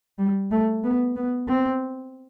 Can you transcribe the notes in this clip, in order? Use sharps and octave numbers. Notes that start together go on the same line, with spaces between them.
G3
A3
B3
B3
C4